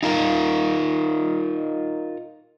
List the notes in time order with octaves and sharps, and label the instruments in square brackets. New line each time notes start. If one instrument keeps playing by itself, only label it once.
[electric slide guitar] D#4 F4 A#4